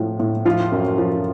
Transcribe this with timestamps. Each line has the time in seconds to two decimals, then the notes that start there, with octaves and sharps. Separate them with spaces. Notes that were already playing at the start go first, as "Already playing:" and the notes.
Already playing: A2 F3
0.20 A2
0.45 F3 F4
0.72 F#2
0.98 F3